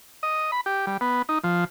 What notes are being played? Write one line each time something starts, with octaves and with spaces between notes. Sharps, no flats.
D#5
B5
G4
G3
B3
D#4
F3